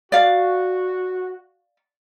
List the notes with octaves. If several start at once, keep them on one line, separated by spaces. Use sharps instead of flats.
F#4 D5 F5